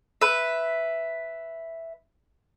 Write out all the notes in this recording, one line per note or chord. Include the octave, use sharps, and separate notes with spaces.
B4 E5